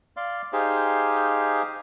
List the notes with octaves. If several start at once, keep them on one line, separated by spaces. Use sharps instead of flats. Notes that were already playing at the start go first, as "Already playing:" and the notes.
D5 F5 C6
D#4 G4 G#4 C5 F5